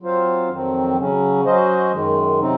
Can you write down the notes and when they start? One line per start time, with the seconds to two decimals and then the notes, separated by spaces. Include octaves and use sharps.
0.01 F#3 C4 F4 C5 F5
0.49 F2 D#3 F#3 C4
0.97 C#3 F#3 C#4
1.44 F#3 C#4 F#4 C5 D#5
1.92 F#2 D#3 G#3
2.39 C3 F#3 C4 D#4